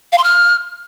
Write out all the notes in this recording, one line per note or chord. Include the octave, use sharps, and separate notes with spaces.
F5
C6
F6